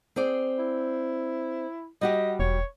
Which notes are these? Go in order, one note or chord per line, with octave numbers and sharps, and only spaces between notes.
C4 G#4 D5
E4
G3 F#4 G4 D#5
E1 C#5